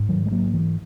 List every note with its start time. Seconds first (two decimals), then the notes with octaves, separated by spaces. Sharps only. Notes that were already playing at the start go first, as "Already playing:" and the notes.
Already playing: G#2
0.09 D#3 F#3
0.26 G#3
0.31 F#3 A#3
0.54 E3